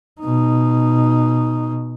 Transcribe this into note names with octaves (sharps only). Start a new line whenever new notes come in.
B2 D#4